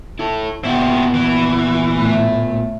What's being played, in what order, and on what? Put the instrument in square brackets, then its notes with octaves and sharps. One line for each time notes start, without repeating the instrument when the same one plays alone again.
[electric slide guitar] E4 A4
[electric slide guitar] A#2 B3 F#5 [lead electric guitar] E4 G4
[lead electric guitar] E3
[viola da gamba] A2 A3